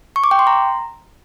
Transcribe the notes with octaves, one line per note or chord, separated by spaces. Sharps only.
C#6
D6
G5
C6
A#5